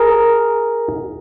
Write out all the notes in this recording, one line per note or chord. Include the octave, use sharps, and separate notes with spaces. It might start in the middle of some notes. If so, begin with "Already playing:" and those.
Already playing: G#4 A#4